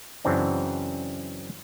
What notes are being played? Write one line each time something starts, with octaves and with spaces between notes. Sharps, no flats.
F#2 C#3 E3 C4 D4